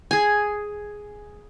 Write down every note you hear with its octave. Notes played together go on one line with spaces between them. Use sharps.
G#4 G#5